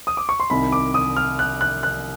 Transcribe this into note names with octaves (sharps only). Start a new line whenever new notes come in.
D#6
D6
C#6
C6
C2 C3 D#3 B5
D6
D#6
F6
F#6
F#6
F#6